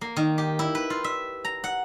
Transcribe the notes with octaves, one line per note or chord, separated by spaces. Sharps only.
A#3
D#3
G4
E4
B4
F4
E5
A#5
F#5